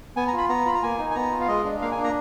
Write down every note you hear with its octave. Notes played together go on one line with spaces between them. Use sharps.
B3 G#5
A#5
F4 B5
B3 A#5
F4 B5
A#5
A#3 G#5
D#4
G#5
B3 A#5
F4
F5
G#3 D#5
D4
A#3 F5
G#5
D4
A#5